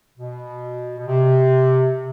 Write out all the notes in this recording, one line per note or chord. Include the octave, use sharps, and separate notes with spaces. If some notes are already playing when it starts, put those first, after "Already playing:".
B2
B2
C3
C3